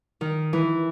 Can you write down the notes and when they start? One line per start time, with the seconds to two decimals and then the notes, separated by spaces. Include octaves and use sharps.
0.21 D#3
0.53 E3